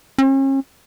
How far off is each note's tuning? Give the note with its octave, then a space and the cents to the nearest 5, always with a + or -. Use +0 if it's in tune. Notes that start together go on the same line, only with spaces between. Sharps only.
C#4 -40